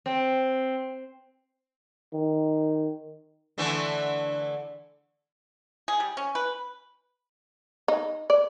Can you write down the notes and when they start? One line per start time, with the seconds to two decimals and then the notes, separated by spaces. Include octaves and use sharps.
0.06 C4
2.13 D#3
3.58 D3 E3 A3
5.88 G#4
6.00 G3
6.17 C#4
6.35 B4
7.88 D#4
8.30 D5